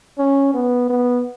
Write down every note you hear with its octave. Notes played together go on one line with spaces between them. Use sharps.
C#4
B3
B3